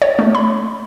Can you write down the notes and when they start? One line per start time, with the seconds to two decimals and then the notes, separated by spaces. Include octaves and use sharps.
0.02 C#5
0.19 A3
0.35 B5